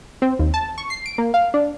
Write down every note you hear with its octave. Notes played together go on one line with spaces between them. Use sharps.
C4
D#2
A5
C#6
C7
D7
A#3
F5
D4